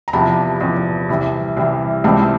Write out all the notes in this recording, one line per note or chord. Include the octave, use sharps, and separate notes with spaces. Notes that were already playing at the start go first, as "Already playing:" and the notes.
A#5
E2 C3 F3 A5 B5
E2 C3 F3
C2 C3 E3
C2 C3 E3
C#2 C3 E3 G3 C4 A5 B5